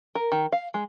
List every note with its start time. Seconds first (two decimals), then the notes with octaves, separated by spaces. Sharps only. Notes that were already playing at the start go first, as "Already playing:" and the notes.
0.15 A#4
0.32 D#3
0.52 F5
0.74 G#3